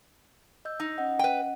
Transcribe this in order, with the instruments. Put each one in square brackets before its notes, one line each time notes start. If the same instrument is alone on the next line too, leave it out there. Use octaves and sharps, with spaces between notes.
[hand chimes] D#5 E6 G6
[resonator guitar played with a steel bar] D#4
[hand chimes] C#4 D#5 F#5
[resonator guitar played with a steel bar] B4 G5